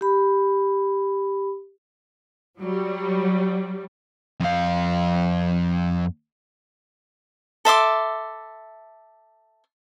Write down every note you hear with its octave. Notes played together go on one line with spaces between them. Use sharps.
G4 B5
F#3 G3
F2 F5
A4 E5 C6 D6